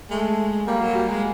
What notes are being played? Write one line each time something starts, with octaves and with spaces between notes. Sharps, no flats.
G#3 A3
G3 A#3
F#3
G3
G#3